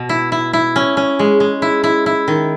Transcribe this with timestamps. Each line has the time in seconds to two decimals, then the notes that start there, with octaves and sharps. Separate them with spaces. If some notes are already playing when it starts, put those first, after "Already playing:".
Already playing: B2
0.09 E4
0.32 E4
0.53 E4
0.76 C#4
0.97 C#4
1.19 G#3
1.40 G#3
1.62 E4
1.84 E4
2.06 E4
2.28 D#3